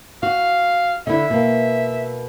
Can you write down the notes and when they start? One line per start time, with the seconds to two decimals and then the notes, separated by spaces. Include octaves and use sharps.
0.23 F#4 F5
1.07 D3 E4 E5
1.30 B2 A#3